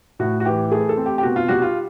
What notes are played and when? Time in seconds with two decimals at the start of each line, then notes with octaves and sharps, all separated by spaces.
0.19 A2 F#4
0.40 F#4
0.45 E3 G4
0.72 A3 G#4
0.89 A4
0.97 C4
1.06 G4
1.18 G4
1.23 B2 F#4
1.36 F4
1.48 G3 F#4
1.62 F4